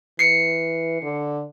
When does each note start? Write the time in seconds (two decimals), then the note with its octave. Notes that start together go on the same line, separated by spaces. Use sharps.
0.19 E3 C7 C#7
1.02 D3